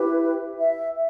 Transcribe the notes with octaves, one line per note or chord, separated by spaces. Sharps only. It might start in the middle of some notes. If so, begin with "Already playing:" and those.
Already playing: E4 G4 B4
E5